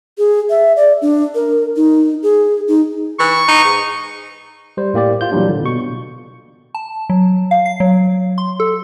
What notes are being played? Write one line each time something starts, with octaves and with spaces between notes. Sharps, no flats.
G#4
E5
D5
D4
A#4
D#4
G#4
D#4
E3 C#6
D#4
G#2
G3 C5
A2 A#3 G4 D5
F4 G6
A#2 E3 F#3 G3 D4
D3
B2 C#6
A5
F#3
F5
C7
F#3
C6
A4